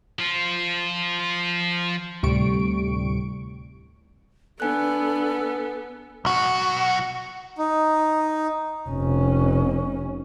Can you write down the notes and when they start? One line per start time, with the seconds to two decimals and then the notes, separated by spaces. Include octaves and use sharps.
0.19 F3 F4
2.23 D2 A2 C3 G3 C#6 D7
4.60 B3 D4 A4 B4 G#5 F#6
6.25 B1 F#4
7.58 D#4
8.89 F1 C#4